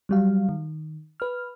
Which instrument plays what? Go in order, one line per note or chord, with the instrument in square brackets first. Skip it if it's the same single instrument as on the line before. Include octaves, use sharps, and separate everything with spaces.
[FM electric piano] F#3 G3 F5
D#3
B4 F6